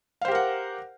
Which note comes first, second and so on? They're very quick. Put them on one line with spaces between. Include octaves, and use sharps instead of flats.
F5 C5 G4 A#4 F#5